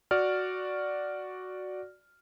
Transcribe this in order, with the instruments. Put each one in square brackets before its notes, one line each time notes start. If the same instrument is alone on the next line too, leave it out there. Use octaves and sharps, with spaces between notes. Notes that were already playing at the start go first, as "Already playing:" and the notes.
[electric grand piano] F#4 D5 F6